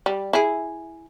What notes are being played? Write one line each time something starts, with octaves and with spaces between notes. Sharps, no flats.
G3
E4 G#4